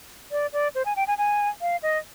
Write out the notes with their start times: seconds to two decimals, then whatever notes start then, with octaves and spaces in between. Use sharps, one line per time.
0.31 D5
0.53 D5
0.75 C5
0.85 G#5
0.96 G5
1.07 G#5
1.18 G#5
1.61 F5
1.83 D#5